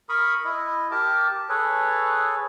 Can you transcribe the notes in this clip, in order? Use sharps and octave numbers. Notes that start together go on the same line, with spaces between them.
A#4 B5 C#6 D#6
E4 D#5
G4 A#4 A5 D6
G#4 A4 B4 C#5